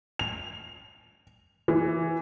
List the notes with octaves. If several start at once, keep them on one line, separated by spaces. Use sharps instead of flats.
F7
E3